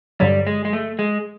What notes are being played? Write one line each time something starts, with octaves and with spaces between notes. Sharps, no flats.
G2 D3 F#3 G3
G#3
G#3
A3
G#3